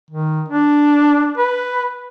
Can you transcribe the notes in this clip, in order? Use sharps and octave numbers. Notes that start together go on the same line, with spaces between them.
D#3
D4
B4